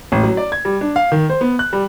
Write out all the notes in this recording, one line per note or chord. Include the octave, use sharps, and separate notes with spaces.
A1
F#3
D5
G#6
G3
D4
F5
D#3
C5
B3
F#6
G3